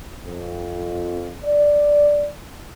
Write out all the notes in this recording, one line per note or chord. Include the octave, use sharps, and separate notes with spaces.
F2
D5